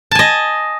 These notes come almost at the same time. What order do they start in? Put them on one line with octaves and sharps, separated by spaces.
A5 G#5 D#5